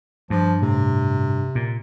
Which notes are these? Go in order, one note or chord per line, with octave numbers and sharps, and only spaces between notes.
G2 F3
A2 C3
A#2